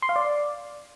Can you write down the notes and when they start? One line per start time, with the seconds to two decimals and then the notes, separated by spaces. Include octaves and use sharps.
0.02 C6
0.09 F5
0.16 D5